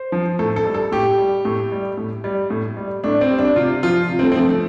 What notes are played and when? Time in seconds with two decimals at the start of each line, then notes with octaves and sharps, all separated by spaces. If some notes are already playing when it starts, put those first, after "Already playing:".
Already playing: C5
0.12 F3
0.39 A2 A4
0.56 A4
0.66 G3
0.74 A4
0.92 A2 G4
1.18 G3
1.45 A2
1.72 G3
1.97 A2
2.24 G3
2.50 A2
2.77 G3
3.04 A2 D4
3.21 C4
3.30 G3
3.39 D4
3.56 C3 F4
3.83 F3 F4
4.09 C3
4.19 C4
4.23 A3
4.32 C4
4.36 F3 A3
4.49 A3